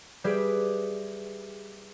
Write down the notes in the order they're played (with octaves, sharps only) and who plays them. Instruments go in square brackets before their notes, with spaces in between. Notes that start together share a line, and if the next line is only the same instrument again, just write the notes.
[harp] G3 G4 G#4 B4 E5